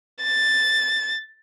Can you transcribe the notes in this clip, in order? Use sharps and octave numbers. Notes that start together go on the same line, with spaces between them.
A6